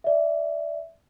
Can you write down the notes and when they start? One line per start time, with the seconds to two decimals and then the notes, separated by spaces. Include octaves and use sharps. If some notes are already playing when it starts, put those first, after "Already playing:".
0.04 D5 E5